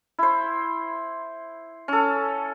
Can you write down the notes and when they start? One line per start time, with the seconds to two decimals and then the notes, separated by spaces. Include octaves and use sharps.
0.19 E4 C5
1.88 C#4 A4